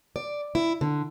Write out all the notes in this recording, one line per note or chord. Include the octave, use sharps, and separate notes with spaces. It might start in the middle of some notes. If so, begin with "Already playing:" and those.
D5
E4
D3